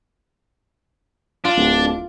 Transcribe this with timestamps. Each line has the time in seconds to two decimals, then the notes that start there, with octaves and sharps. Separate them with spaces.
1.45 D4 F4
1.57 D1